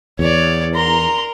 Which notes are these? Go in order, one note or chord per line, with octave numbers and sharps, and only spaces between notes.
E2 C#5 D5
A#4 A#5 C6